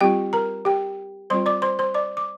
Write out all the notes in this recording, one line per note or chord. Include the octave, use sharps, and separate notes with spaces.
G3 C4 F4 G4 G5
A#4 A#5
G4 G5
G3 C4 F4 C5 C6
D5 D6
C5 C6
C5 C6
D5 D6
D6